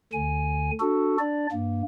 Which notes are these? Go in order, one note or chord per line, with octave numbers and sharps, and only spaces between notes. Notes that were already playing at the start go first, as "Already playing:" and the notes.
D2 D3 G#5
D4 F#4 A4
D4 D5
G2 A#3